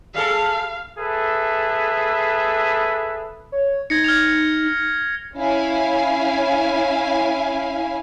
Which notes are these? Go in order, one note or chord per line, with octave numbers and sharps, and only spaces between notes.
G3 G#4 A4 F5
G#4 A4 B4 E5
C#5
D#4 G#6 A#6 C#7
F6 G#6 F7
C#4 E4 F5 G#5